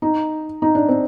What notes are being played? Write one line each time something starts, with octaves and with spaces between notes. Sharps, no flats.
D#4
D#4
D4
C4